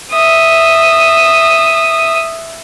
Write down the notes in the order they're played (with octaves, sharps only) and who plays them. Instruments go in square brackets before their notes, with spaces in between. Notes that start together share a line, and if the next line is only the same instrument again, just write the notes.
[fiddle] E5 D#6